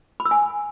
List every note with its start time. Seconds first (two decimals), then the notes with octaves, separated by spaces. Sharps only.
0.20 B5
0.25 E6
0.31 G#5